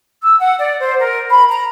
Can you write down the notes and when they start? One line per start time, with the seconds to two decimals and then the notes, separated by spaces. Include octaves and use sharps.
0.21 E6
0.39 F#5
0.59 D5
0.80 C5
0.99 A#4
1.29 B5
1.50 A#5